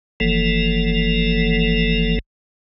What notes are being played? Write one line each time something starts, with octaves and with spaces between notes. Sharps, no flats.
F#1 E3 F3 A#3 A4